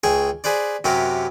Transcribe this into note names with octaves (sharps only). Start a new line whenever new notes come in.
C#2 G#4 G5 C#6
G#4 B4 C5 D5
F#2 C3 F#3 G4 A#4